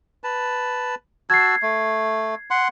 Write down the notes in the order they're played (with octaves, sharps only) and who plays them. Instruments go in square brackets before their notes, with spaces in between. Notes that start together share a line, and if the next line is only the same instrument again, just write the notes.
[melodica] B4 A5
[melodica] F#4 A5 E6 [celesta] G#6 C7
[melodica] A3
F#5 C6